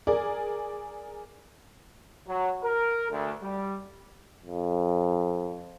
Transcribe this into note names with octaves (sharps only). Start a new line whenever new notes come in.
G#4 A#4 D5
F#3
A#4
D2
G3
F2